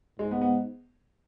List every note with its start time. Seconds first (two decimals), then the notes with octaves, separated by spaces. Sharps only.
0.19 G#2 G#3
0.31 B3
0.41 B3